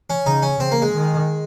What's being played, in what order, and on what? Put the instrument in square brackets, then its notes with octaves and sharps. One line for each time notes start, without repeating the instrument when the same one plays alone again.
[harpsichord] C#4
[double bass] C#3 [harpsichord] D#4
[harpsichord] C#4
[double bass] C#3 [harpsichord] C4
[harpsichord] A#3
G#3
[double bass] D#3